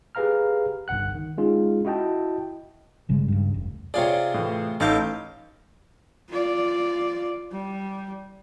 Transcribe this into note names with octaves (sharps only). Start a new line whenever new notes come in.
G4 G#4 B4 F5 A#5 F6
G1 C2 F#5 F#6
D#3
G#3 C#4 D#4 F4 G#4
E4 F#4 D#5 G5 A5
G1 C#3 G3 G#3
C#2 G2
F1
C3 F4 G#4 C#5 D5
A2 E3
A1 D#4 A4 F5 D6 G6
F4 D5
G3